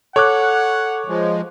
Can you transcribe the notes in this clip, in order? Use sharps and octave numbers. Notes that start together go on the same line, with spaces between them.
A4 C#5 F#5 D6 F#6
F3 G#3